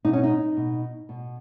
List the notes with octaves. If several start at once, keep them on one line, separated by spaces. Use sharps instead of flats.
B2 D#4
C#4
D#4
B2
B2